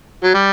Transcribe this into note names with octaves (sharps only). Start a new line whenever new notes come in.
F#3
G3